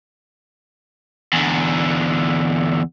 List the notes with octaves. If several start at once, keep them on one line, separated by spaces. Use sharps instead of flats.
E2 D3